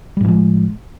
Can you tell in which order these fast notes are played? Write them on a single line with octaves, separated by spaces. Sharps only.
G3 A2 F3 G#3